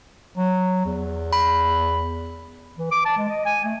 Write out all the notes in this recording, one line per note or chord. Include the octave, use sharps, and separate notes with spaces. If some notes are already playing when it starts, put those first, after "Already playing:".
F#3
E2
B5
E3
D6
A5
G#3
D#5
G#5
A3